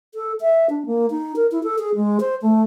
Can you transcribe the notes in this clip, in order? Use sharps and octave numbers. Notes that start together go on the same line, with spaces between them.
A4
E5
D4
A#3
D#4
A#4
E4
A4
G#4
G#3
C5
A3